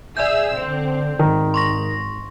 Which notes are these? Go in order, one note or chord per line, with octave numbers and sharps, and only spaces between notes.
G#4 D5 E5 E6 G6
D3 C4
G#1 D#3
C6 C#6 A#6